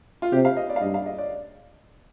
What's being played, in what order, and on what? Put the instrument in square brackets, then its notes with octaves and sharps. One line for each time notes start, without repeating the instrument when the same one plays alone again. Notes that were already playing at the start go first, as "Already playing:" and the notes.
[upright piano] F4
[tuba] C3 [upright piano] G4
[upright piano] F5
D#5
D5
F5
[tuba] G2 [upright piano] D#5
[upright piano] F5
D#5
D5